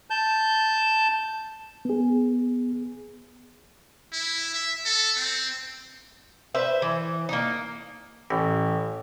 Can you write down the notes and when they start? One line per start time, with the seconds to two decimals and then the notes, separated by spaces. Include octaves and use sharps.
0.10 A5 G6
1.85 B3 G#4
4.13 E4
4.54 E5
4.85 A4
5.17 C4
6.55 B4 C5 E5
6.82 E3
7.29 A#3 D#4
8.31 A1